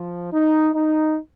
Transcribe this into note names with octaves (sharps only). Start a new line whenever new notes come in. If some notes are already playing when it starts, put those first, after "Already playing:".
Already playing: F3
D#4
D#4